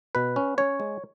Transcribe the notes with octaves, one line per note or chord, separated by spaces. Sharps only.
B2 B4
C#4
C#4 C#5
G#3